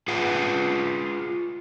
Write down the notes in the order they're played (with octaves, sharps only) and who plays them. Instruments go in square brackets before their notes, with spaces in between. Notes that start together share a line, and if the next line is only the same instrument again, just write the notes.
[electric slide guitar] F4 G#4 B4 F#5